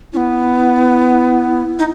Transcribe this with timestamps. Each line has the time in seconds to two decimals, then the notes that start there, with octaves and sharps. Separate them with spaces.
0.13 C#4 E4
0.17 B3
1.79 D#4